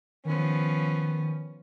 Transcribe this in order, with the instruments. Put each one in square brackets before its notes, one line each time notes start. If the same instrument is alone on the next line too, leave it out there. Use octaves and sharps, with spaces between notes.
[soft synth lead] D#3 [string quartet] F3 B3 C#4